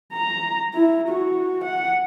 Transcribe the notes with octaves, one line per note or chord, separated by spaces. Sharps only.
A#5
E4
F#4
F#5